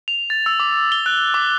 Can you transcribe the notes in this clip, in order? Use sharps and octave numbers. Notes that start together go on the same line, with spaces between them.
F7
A6
E6
D6
G7
F#6
D6